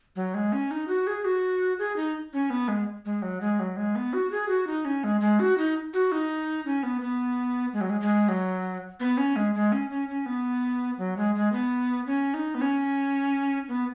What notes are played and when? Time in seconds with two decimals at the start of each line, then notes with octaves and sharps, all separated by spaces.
0.16 F#3
0.34 G#3
0.52 C#4
0.71 D#4
0.88 F#4
1.07 G#4
1.25 F#4
1.79 G#4
1.96 D#4
2.33 C#4
2.50 B3
2.68 G#3
3.05 G#3
3.22 F#3
3.41 G#3
3.59 F#3
3.77 G#3
3.95 B3
4.13 F#4
4.31 G#4
4.49 F#4
4.67 D#4
4.85 C#4
5.04 G#3
5.21 G#3
5.40 F#4
5.58 D#4
5.94 F#4
6.12 D#4
6.65 C#4
6.83 B3
7.01 B3
7.73 G#3
7.81 F#3
7.90 G#3
8.01 G#3
8.28 F#3
9.00 B3
9.17 C#4
9.36 G#3
9.55 G#3
9.72 C#4
9.90 C#4
10.09 C#4
10.26 B3
10.98 F#3
11.17 G#3
11.35 G#3
11.52 B3
12.07 C#4
12.34 D#4
12.55 B3
12.61 C#4
13.68 B3